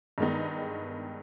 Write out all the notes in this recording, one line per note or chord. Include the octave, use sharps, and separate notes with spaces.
G2 D#3 G#3 B3 D#4